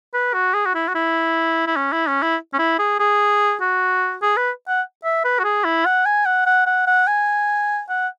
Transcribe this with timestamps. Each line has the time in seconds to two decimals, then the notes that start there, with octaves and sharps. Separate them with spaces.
0.14 B4
0.34 F#4
0.54 G#4
0.66 F#4
0.75 E4
0.88 F#4
0.95 E4
1.67 E4
1.77 C#4
1.93 E4
2.07 C#4
2.23 E4
2.54 C#4
2.59 E4
2.79 G#4
3.00 G#4
3.61 F#4
4.22 G#4
4.37 B4
4.68 F#5
5.04 E5
5.25 B4
5.39 F#4
5.44 G#4
5.65 E4
5.86 F#5
6.06 G#5
6.26 F#5
6.46 F#5
6.66 F#5
6.87 F#5
7.07 G#5
7.89 F#5